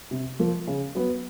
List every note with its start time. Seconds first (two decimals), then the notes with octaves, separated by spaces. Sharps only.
0.11 C3
0.39 F3 A#3
0.67 C#3
0.95 F#3 B3